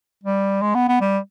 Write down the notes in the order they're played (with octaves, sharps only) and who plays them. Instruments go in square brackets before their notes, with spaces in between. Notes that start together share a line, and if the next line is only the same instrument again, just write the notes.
[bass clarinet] G3
G#3
B3
B3
G3